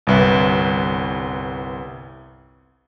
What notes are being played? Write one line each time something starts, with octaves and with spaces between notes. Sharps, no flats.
G1 C2 B4